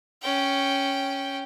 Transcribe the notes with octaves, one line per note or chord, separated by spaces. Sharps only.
C#4 G5